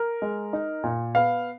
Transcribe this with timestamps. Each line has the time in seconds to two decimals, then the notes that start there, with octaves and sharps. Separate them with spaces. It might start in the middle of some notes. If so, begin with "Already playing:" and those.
Already playing: A#4
0.22 G#3
0.53 D#4
0.84 A#2
1.15 B3 F5